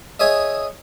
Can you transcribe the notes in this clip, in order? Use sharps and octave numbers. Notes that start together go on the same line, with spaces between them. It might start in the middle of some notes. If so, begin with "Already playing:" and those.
G#4 C#5 D#5 E5